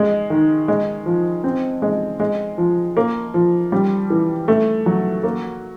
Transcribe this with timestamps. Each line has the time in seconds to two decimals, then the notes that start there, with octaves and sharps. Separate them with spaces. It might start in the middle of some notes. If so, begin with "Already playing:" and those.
Already playing: G#3
0.30 D#3
0.68 G#3
1.06 F3
1.44 C4
1.82 G#3
2.20 G#3
2.58 F3
2.97 A#3
3.34 F3
3.72 G3
4.10 E3
4.48 A3
4.86 F#3
5.23 A#3